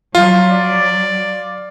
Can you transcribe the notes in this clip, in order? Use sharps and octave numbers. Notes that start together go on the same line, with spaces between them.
F#3 F4
D5